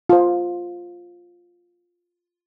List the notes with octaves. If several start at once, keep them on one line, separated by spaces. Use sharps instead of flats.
F4 C5